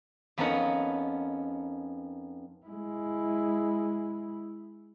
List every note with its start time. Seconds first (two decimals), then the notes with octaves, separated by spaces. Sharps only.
0.38 F2 B3 C#4 D#4 A#4 F#5
2.66 G#3 E4